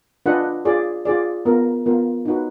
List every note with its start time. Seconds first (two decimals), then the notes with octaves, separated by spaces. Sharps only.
0.26 D4 F4 B4 D#5 F#5
0.65 F4 G#4 D5
1.05 F4 G#4 D5
1.45 B3 F4 A#4
1.86 B3 F4 A#4
2.26 D#4 F#4 B4